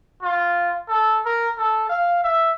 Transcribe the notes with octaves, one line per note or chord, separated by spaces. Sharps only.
F4
A4
A#4
A4
F5
E5